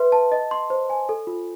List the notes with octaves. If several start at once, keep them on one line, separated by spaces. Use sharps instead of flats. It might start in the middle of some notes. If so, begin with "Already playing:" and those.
Already playing: B4 E5 C6
A5
D#5
C6
C5
G#5
A4
F4